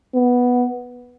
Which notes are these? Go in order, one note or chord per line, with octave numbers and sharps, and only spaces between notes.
B3